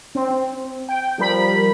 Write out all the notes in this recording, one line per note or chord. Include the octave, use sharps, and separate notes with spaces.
C4
G5
F3 G3 A#4 B5 B6